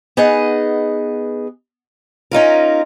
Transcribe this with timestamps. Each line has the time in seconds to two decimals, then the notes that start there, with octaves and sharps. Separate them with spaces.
0.17 B3 D#4 G#4 D#5 F#5
2.31 C#4 D#4 F4 A#4